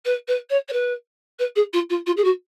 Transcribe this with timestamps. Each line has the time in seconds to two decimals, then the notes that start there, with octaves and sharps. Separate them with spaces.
0.05 B4
0.28 B4
0.50 C#5
0.68 C#5
0.72 B4
1.39 B4
1.56 G#4
1.73 F4
1.90 F4
2.06 F4
2.17 G#4
2.24 F#4